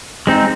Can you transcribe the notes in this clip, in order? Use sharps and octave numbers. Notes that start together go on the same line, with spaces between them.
G#3 C4 D#4